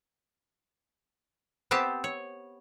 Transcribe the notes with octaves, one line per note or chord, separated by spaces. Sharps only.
B3 C4 G4 G5 A5
C#5